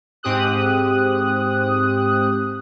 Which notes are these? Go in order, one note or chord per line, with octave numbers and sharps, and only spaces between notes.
G#2 C4 G4 D#6 F#6